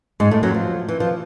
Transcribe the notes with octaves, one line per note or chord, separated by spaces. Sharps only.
G#2 G#3
A2 A3
F#2 F#3
F3
E3
F3